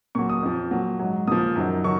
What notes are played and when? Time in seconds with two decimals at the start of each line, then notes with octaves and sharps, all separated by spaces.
0.15 A#2 F#3 C#6
0.29 D#6
0.43 F2 F3
0.71 A#2 F#3
0.99 G#2 F#3
1.27 A#2 F3 D#6
1.56 F#2 D#3 F#3
1.84 D#3 F#3 C#6